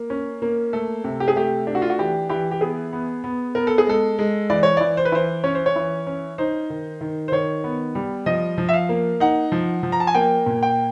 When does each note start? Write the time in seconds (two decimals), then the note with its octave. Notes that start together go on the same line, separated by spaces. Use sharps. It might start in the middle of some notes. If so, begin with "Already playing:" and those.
Already playing: A#3
0.10 C#4
0.42 A#3
0.73 A3 A4
1.04 C3
1.20 G4
1.28 G#4
1.36 A3 G4
1.67 D4 G4
1.75 F#4
1.82 F4
1.90 F#4
1.99 E3 G4
2.29 E3 G4
2.51 G4
2.61 B3 G#4
2.93 B3
3.24 B3
3.55 B3 A#4
3.67 A4
3.78 G#4
3.87 G#3 A4
4.19 G#3
4.50 E3 D5
4.63 C#5
4.77 E3 D5
4.97 C5
5.05 B4
5.12 E3 C5
5.44 C#4 C#5
5.55 C5
5.66 C#5
5.76 E3
6.07 C#4
6.38 D#4 C5
6.70 D#3
7.01 D#3
7.28 C5
7.32 D#3 C#5
7.64 B3
7.95 G3
8.26 F3 D#5
8.58 F3
8.69 E5
8.73 F5
8.89 A#3
9.20 D#4 F#5
9.52 F3
9.83 F3
9.92 A#5
10.00 A5
10.07 G#5
10.15 A#3 G5
10.46 A#2
10.63 G5